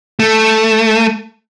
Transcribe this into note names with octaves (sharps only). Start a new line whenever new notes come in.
A3